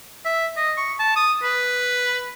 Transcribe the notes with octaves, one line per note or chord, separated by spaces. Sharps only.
E5
D#5
C#6
A5
D#6
B4